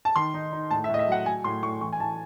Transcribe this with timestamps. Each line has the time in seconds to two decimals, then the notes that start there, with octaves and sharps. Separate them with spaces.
0.05 A5
0.16 D#3 C6
0.34 D#4
0.52 D#4
0.71 A2 A5
0.84 E5
0.89 A2 D#5
0.99 E5
1.08 F#3 F#5
1.26 F#3 G#5
1.44 A2 C6
1.63 A2 C#6
1.81 E3 C#6
1.93 G#5
2.00 E3 A5